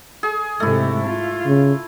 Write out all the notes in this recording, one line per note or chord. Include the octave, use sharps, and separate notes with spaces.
G#4
G#2 C3 A3 E4
F4
C#3